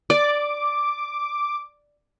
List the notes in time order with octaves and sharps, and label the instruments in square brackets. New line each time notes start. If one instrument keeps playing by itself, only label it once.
[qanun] D5 [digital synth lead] D6